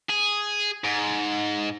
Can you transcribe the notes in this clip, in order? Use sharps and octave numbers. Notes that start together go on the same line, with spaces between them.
G#4
G#2